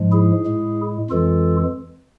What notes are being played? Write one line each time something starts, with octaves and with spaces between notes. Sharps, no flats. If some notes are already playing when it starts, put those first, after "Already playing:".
Already playing: G#2 F3 G#3
E4 G#4
A2 G#3
F2 E3 G#3 F4 A4